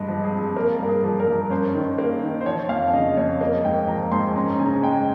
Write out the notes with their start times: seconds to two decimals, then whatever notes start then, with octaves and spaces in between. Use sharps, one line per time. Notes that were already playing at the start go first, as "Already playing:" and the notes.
Already playing: G2 G#3 D#5
0.08 F3
0.24 G#4
0.32 C4
0.56 A#3 A#4
0.79 G2 A#4
0.88 G#4
1.03 F3
1.20 A#4
1.27 G2
1.50 C#4 C5
1.75 D#3
1.98 A#3
2.23 D#3
2.41 C5
2.46 F3 C#5
2.69 F2 F5
2.93 C#3 D#5
3.17 F2 C#5
3.41 A#3 D#5
3.64 G#2 G5
3.87 F3 A#5
4.12 G#2 C6
4.36 C#4 A#5
4.59 C#3 G#5
4.66 A#5
4.73 G#5
4.82 G#3 G5